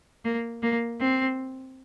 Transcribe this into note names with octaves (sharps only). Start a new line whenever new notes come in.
A#3
A#3
C4